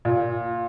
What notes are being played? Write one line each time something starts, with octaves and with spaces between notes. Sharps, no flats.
A#2